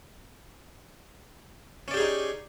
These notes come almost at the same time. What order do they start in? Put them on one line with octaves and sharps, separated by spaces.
C#4 D5 G4 G#4 D#4